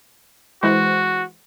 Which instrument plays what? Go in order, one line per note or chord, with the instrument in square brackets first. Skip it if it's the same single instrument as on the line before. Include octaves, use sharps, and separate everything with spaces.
[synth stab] E3 G#3 C5 [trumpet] F#4